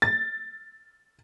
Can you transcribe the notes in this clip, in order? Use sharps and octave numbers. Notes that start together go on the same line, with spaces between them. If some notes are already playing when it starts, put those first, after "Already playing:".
A6